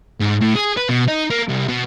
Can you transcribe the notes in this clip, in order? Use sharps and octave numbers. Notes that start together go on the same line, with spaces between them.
G#2
A2
G#4
B4
B2
D#4
A#3
C2
B2